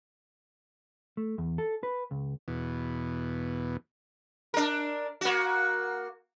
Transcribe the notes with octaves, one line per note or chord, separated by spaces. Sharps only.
A3
E2
A4
B4
C#2
E2 B2
D4 A#4
A#3 F#4